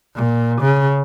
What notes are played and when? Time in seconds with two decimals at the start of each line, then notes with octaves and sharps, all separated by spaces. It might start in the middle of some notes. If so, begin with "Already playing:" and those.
0.15 A#2
0.61 C#3